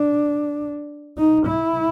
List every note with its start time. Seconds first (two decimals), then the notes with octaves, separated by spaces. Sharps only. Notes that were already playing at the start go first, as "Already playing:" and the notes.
Already playing: D4
1.18 D#4
1.46 E4